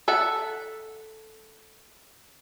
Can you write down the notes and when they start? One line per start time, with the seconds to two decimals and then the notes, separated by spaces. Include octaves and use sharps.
0.08 A4 E5 F#5 A5